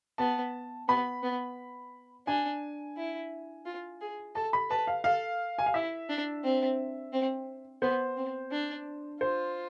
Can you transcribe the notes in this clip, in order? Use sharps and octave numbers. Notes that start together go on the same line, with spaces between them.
B3 A5
B3 B5
B3
D4 G#5
E4
F4
G#4
A4 A5
B5
B4 A5
F5
A4 F5
G#5
F5
E4 E5
D4
C4
C4
B3 C5
C4
D4
F4 C5